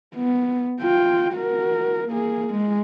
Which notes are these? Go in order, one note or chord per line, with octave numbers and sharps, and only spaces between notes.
B3
F4 G5
F#4 A#4
A#3 G#4
G#3